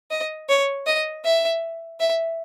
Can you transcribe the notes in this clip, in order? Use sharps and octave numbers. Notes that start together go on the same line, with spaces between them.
D#5
C#5
D#5
E5
E5